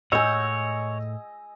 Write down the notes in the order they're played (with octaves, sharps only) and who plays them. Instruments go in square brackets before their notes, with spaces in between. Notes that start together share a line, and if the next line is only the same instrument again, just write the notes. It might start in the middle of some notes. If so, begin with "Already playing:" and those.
[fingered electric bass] A2 [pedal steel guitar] C#5 F#5 [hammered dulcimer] D#5 G#5 [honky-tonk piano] E6 G6